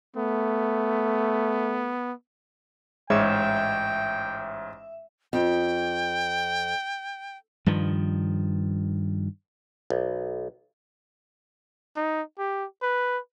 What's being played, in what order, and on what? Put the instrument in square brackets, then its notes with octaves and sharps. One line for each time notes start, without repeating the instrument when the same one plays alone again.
[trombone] A3 [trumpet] B3
[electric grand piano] A1 G#2 C#5 [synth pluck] G#3 E7 [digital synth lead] E5 [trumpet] G5
[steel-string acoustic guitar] F2 [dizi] G5
[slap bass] G2 D#3 F3
[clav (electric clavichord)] B1
[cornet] D#4
G4
B4